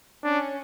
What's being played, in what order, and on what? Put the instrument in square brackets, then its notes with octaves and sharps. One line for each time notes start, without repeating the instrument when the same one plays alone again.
[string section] C#4 [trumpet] D4